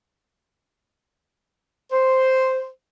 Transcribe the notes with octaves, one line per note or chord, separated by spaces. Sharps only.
C5